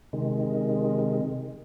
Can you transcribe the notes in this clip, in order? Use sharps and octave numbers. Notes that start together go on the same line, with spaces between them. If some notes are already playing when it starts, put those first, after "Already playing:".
C3 D#3 G#3